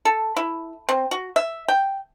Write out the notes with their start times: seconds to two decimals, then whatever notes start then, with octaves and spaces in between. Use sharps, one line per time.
0.05 A4
0.36 E4
0.89 C4
1.11 F#4
1.36 E5
1.68 G5